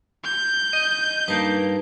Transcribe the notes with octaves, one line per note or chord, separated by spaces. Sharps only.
G6
D#5
G2 A#3 D#4 B4 A5